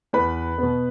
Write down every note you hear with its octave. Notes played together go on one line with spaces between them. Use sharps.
E2 B4 B5
B2 B3